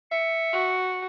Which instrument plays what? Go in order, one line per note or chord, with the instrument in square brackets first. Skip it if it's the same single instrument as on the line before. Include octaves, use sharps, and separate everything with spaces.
[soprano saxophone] E5 [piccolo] C#7
[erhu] F#4